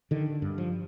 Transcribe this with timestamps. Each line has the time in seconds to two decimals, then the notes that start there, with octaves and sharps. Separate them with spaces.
0.11 D3 D#3
0.42 G2
0.58 F3